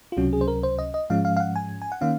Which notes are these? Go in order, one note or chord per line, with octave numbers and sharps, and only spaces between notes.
F4
C#2 C3 F#3 C#4 F#4
G#4
C5
A#4
C5
D#5
D#5
G#2 F3 G#3 C#4 F5
F5
F5
F#5
G#5
G#5
F#5
D#3 A#3 C#4 F5